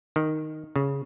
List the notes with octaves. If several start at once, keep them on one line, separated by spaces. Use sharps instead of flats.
D#3
C#3